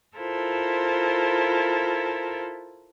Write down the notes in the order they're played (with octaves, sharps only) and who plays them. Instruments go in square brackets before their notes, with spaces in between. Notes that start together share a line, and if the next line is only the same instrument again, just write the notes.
[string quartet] E4 F4 A4 A#4 C5